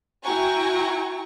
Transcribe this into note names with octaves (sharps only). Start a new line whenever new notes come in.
E4 F#4 G5 G#5 A#5 C#6